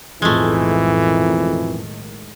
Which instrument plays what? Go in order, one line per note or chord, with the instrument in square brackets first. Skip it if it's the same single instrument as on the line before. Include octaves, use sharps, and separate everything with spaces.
[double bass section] B1 A2 D#3 [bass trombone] F2 [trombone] E3 [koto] G#3 A3